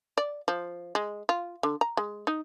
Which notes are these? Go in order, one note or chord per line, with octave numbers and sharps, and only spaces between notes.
D5
F3
G#3
F4
D3
A#5
G#3
D#4